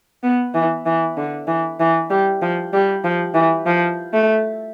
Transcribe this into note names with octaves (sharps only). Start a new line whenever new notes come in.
B3
E3
E3
D3
E3
E3
G3
F3
G3
F3
E3
F3
A3